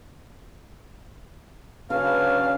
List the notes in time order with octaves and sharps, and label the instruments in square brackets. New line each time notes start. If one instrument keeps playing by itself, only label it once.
[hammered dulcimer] C#3 [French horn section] F#3 D4 B4 [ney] C#4 [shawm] F5